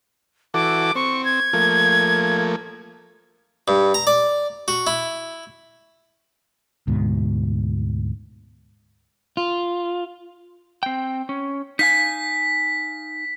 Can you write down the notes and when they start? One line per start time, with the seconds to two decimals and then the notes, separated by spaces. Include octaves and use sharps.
0.54 E3 F#4 A4 D6
0.95 C4 C#6
1.25 G#6
1.53 F3 A3 A#3
3.68 G2
3.94 A#5
4.07 D5
4.68 F#4
4.87 E4
6.88 D2 G#2 B2
9.37 F4
10.83 C4 G5
11.29 C#4
11.79 D#4 F5 G#5 B6